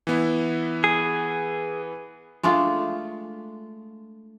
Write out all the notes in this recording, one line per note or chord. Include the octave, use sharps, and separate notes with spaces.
E3 B3 E4
G#4
G#3 A3 D4 F4